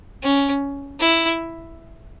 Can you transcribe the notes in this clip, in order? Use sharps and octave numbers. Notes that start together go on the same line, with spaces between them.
C#4
E4